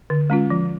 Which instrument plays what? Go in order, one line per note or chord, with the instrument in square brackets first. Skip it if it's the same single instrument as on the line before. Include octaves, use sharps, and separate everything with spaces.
[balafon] D3
G#3 C#4 F4
F3